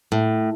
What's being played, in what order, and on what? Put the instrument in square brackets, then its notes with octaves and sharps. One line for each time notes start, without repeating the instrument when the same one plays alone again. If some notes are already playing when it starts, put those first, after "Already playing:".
[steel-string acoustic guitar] A2